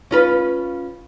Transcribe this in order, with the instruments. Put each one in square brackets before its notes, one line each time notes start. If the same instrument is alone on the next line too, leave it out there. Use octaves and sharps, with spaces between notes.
[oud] C#4 F4 B4